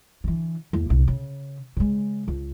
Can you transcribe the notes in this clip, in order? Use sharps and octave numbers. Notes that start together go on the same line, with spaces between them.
D3 E3
E2 A#3
C2 A#2
C#3
C#3 G#3
C#2